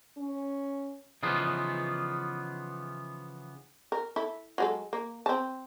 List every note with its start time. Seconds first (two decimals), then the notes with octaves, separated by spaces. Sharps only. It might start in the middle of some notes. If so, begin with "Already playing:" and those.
0.17 C#4
1.23 C#3 E3 F3 B3 D#4 F4
3.92 A#4
4.16 E4 A4
4.58 F#3 G#3 A4
4.93 A#3
5.26 C4 A5